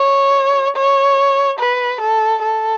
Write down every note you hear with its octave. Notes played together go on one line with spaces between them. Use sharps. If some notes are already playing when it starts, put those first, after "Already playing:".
Already playing: C#5
C#5
B4
A4
A4